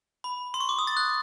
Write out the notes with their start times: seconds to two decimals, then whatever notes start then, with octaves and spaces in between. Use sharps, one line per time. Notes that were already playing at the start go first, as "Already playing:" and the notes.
0.24 B5
0.54 C6
0.60 C#6
0.69 D6
0.78 D#6
0.87 A6
0.97 F#6